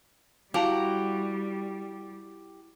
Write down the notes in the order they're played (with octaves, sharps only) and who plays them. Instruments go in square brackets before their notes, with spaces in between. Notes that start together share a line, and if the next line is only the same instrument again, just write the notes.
[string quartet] G3 [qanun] E4 F#4 A#5 [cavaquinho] G4 [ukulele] F5 A5